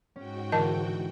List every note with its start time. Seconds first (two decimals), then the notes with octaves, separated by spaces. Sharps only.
0.16 G#2 C#4 F#4 G5
0.52 D3 E3 A#4 D#5 A5